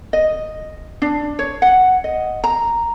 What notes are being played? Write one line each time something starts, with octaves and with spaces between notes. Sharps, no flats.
D#5
D4
C#5
F#5
D#5
A#5